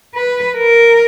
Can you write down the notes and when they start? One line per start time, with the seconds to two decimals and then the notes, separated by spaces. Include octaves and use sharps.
0.15 B4
0.57 A#4